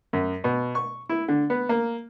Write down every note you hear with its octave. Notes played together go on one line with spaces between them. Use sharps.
F#2
B2
C#6
E4
D3
B3
A#3